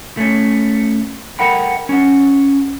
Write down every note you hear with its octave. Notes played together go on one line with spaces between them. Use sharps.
A3 C#4
A4 A#4 E5 F#5 G5 B5
C#4 F#5